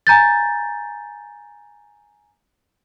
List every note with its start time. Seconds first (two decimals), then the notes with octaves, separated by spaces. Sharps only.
0.07 G#5 A#5 G6 A6